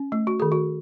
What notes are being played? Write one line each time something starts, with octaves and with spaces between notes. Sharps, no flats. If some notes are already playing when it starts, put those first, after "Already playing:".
Already playing: C#4
A3
F#4
D#3 G#4
F#4